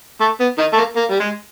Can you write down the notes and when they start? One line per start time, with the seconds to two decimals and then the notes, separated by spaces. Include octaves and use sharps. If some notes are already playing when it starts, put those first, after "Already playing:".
0.21 A3
0.40 B3
0.59 D#3 D#4
0.73 A3
0.77 A#3
0.96 A#3
1.10 G3
1.20 G#3